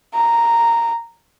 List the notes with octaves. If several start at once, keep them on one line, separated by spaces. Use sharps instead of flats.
A#5